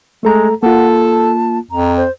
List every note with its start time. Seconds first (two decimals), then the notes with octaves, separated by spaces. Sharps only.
0.23 G#3 A3 A4 A#5
0.63 A#3 F4 A4 F#5
0.96 A5
1.71 F2 A#5
1.97 C5